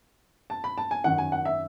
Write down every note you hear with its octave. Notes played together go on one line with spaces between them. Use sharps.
A5
B5
A5
G#5
F#2 D#3 F#5
G#5
F#5
E5